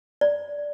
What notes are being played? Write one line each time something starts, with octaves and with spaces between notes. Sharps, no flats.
D5